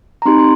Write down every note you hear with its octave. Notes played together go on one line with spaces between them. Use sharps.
A#5
C4 D#4 G4 C6
C6